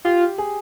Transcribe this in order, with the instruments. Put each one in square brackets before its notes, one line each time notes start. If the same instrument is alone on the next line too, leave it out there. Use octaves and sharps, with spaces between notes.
[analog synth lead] F4 [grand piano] G4
[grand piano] G#4